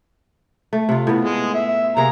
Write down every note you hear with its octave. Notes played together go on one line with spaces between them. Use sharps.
A3
C3 F4
A2 B3
G#3
E5
C3 A#3 G#4 A#5